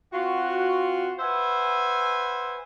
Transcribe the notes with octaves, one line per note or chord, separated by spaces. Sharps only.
C4 F4 F#4
B4 C5 E5 F#5 G#5